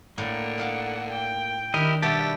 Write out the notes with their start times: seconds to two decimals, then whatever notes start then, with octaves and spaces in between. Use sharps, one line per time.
0.18 A2 D3 A#3
0.58 D#4 F5 F#5 A5
1.12 G5
1.74 D#3 D4 E4 G4 A#4 D#5
2.02 B2 G3 B3 G4 E5 A5